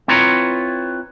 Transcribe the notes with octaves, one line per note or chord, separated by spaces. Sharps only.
C4 E4 F4 B4 C#5 A#5